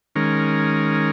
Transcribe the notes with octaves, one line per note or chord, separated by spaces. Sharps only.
D#3 G#3 C#4 A#4